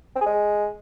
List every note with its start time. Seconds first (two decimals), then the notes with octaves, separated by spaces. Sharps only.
0.16 C4
0.21 G#4
0.26 G#3